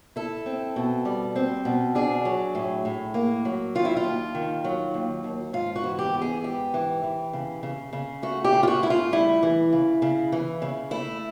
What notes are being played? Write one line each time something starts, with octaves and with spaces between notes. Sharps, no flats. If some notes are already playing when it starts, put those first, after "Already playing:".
E4 A4
C4
B2
G3
C4
B2
D4 G#4
F#3
A2
A2
A#3
F#3
D#3 F4
E4
F4
D#2
D#3
F#3
D#2
D#2
G#2 F4
F#4
E3
G4
B3
G#4
G#2 G4
E3
E3
C#3
C#3
C#3
A3 F#4
G4
C#3
F4
F#4
A3 E4
F4
G3 E4
E3
C#3
C#3
E3
C#3
A3 E4